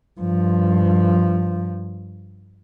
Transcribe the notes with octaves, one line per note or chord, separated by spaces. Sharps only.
G2 F3